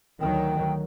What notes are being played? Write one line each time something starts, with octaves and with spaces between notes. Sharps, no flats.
D2 D#3 F#3 G5